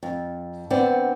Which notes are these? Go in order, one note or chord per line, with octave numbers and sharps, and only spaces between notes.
F2
D3 B3 C4 D5